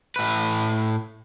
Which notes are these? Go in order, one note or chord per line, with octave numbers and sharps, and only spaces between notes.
A2 B4